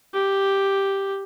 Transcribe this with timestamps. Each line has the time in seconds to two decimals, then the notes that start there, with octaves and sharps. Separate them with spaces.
0.14 G4